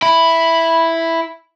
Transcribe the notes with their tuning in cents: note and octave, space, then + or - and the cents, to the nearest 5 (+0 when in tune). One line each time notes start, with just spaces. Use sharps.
E4 +0 B5 +0